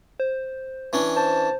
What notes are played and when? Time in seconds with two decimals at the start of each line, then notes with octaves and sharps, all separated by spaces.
0.20 C5
0.93 E3 C#4 D4
1.16 C5 A5